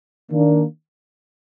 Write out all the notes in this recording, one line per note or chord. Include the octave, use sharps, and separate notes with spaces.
D#3 A#3 D4